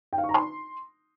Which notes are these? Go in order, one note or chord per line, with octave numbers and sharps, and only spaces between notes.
G5
F5
C#6
A#5
C6